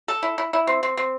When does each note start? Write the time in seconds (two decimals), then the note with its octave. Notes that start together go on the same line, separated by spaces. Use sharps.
0.08 A4
0.23 E4
0.38 E4
0.53 E4
0.67 C4
0.83 C4
0.97 C4